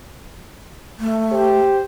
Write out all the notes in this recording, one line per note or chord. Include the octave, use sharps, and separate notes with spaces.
A3
G4 C5